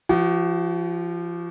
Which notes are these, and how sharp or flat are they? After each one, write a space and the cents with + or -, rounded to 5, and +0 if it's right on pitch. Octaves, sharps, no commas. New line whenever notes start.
F3 -25 F#4 +35